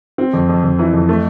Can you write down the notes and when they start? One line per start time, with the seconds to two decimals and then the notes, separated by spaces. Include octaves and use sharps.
0.18 C4
0.33 F2
0.49 F2
0.64 F2
0.79 E3
0.93 F2
1.09 A3